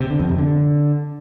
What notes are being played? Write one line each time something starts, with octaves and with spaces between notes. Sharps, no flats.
C3
D3
F2
C3
D3